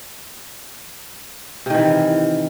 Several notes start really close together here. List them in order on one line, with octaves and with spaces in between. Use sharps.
C3 D#3 E3